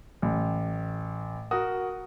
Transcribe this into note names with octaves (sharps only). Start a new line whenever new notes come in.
A1
F#4 A#4 D#6